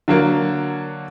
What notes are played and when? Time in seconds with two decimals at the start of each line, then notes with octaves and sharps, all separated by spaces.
0.08 D3 F#3 A#3